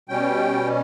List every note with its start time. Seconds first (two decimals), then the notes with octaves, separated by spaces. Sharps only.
0.09 B2 G3 C#4 G5